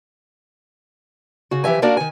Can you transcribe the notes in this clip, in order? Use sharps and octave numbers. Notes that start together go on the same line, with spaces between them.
C#3 F#4
E3 F3 G4 E5 G#5
A#3 D4 F#4 A#4 D5 F5
D#3 G#5